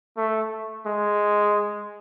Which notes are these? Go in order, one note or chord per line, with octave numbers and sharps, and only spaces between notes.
A3
G#3